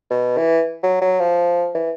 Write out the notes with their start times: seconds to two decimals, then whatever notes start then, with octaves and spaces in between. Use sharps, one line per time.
0.10 B2
0.38 E3
0.83 F#3
1.01 F#3
1.20 F3
1.75 E3